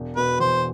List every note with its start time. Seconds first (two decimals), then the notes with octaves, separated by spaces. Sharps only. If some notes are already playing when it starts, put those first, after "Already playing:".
Already playing: E1
0.16 B2 B4
0.40 E2 C5